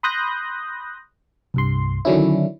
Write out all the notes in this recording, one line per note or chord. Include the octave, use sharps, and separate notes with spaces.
B5 C6 D#6 F#6 G6 A#6
C2 G2 C6
D3 D#3 F#3 C#4 D4 E4